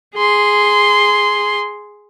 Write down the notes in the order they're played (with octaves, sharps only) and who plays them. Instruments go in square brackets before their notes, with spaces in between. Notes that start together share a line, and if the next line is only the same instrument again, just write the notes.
[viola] G#4 C6